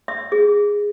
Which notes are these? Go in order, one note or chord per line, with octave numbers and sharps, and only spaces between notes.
E5
G#4